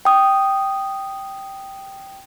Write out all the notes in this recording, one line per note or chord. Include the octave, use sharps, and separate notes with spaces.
G5 D#6